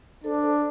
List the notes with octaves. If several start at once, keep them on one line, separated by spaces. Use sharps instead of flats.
D4 A4 C5
A4 C5